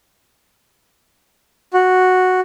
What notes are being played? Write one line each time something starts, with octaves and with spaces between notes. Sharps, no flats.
F#4